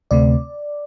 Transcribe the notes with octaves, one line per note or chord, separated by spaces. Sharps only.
D2 C3 A3 C4 D5